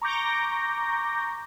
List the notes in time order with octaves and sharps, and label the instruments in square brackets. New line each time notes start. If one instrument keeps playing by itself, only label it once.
[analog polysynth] A#5 C#6 D6 G6 A#6